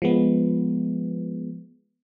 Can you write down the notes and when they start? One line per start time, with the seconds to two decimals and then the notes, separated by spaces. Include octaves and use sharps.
0.02 F3 G#3 B3